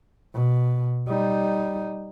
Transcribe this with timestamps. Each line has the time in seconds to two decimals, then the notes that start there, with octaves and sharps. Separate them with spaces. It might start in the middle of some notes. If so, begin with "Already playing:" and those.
0.35 B2
1.08 G3 D#4